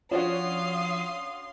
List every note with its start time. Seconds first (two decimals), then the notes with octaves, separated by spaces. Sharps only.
0.12 F3 C#4 D4 F#4 F5 C6 D#6